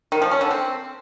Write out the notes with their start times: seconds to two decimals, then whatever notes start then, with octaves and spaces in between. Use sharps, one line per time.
0.12 D#3
0.22 F3
0.31 C#4
0.41 D3
0.51 C4